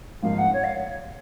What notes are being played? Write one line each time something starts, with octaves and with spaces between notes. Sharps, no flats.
G#1 G#2 F3 A#3 D#4 F5
F#5
C#5
F5